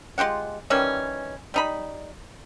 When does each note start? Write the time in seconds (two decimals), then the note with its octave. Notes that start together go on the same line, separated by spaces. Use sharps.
0.18 G#3 F4 G4 F#5
0.70 D#3 E3 G3 C#4
1.54 G3 D#4 B5